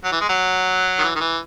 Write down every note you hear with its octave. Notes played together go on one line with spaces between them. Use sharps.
F#3
E3
G#3
F#3
D#3
E3
D#3
E3